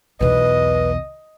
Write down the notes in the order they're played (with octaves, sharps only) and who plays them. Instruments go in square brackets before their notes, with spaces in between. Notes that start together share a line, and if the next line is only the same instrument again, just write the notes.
[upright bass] B1 E2 [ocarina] B4 [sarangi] D#5